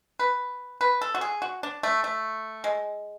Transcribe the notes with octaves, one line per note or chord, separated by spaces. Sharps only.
B4
B4
A4
F#4
G#4
F#4
D4
A3
A3
G#3